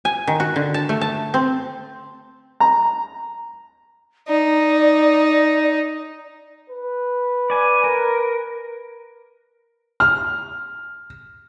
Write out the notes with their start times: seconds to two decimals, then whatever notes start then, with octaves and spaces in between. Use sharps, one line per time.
0.05 G#5
0.27 D#3
0.40 F#4
0.56 D3
0.74 A5
0.89 A3
1.01 A5
1.34 C4
2.60 A#5
4.28 D#4 D5
6.70 B4
7.50 D5 G#5
7.84 A#4
10.00 F6